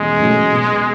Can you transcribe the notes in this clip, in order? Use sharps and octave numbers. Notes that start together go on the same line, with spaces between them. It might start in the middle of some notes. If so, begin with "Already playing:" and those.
Already playing: E2 B2 G#3 C#4
B2 F#3 A3 C#4
B2